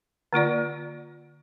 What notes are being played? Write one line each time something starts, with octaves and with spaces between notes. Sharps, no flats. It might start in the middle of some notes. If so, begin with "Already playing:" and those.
D3 A#3 F4 D5